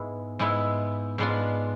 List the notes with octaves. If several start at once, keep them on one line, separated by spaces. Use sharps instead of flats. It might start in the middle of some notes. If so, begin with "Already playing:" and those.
Already playing: G#2 G#3 B3 E4
G#2 G#3 B3 E4
G#2 G#3 B3 D4 F4